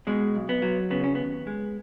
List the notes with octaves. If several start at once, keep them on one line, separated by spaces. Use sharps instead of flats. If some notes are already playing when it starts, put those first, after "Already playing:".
B2 G#3
B1
B3
F#3
C#3 B3
C#4
D#2 B3
G#3